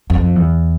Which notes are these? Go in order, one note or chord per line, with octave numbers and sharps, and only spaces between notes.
F2
E2